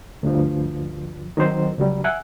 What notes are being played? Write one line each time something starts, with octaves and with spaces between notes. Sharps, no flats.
D2 G2 F3
D#3 F#3 C4 C5
C#2 F#3 G3
E5 F#5 G#5 F#6